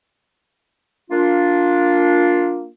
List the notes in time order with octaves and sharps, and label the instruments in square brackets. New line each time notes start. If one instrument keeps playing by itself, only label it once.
[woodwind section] A#3 D4 F4